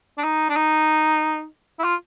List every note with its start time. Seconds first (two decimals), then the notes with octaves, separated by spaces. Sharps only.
0.18 D4
0.23 D#4
0.49 D4
0.56 D#4
1.79 E4
1.84 F4